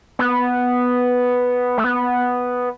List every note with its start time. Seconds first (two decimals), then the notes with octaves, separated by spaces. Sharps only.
0.19 B3
1.78 A3
1.84 B3